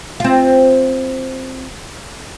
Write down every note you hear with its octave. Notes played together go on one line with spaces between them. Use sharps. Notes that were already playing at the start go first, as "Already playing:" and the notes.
C4 F4